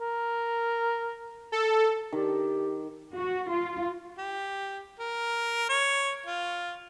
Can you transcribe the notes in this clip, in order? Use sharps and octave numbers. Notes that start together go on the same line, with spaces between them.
A#4
A4
D#3 G4
F#4
F4
G4
A#4
C#5
F4